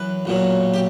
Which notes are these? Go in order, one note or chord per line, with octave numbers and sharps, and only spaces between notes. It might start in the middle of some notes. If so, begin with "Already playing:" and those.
Already playing: F#2 E3 B4
B1 A#2 F#3
G4